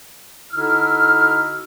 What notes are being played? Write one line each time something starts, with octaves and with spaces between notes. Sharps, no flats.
D3 D#4 E4 F#4 E6 F6